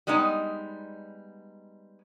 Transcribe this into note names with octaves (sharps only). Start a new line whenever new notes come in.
G3 G#3 B3 D#4